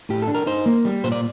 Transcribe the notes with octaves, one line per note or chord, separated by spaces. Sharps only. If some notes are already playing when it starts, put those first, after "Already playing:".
A2 G4
A4
D4
A#4
D#4 C5
A#3
G3
A#2 C5
D5